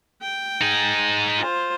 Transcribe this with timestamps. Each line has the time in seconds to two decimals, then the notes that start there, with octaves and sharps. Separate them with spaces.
0.22 G5
0.61 D#4 G#4
1.37 F4 C5